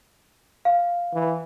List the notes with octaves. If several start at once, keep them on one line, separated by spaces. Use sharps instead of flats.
F5
E3